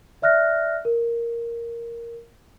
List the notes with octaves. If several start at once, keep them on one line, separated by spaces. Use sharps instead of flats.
D5 E5 F6 F#6 A#6
A#4